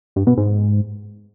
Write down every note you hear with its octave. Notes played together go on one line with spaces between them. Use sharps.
G2
B2
G#2